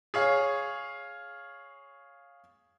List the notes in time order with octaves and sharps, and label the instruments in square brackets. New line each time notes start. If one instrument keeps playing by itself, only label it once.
[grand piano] G#4 C#5 F5